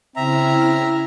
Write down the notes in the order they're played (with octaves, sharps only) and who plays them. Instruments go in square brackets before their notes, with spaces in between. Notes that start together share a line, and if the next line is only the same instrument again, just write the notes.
[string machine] C#3 E4 F6 [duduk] C4 [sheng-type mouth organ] E5 A#5